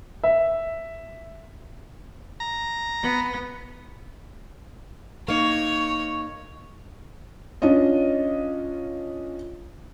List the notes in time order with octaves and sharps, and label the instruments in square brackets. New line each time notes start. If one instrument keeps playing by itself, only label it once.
[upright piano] E5
[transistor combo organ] A#5
[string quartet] B3
[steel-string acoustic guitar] A#3 D#4 [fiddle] C#5 [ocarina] C#6
[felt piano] C#4 D4 F4 D#5